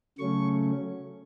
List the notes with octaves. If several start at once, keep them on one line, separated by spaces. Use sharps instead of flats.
C#3 F#3 A3 C#4 C#6